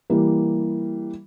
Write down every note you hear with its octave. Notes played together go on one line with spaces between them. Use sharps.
E3 G3 A#3